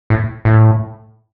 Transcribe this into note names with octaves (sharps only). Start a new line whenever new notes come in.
A2
A2